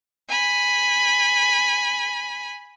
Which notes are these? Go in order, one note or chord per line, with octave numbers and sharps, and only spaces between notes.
G#5 B5